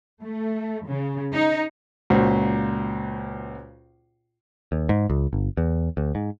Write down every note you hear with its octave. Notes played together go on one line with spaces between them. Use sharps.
A3
C#3
D#4
C#2 A#2 F#4 C5
D#2
G#2
C#2
G1
E2
D2
G#2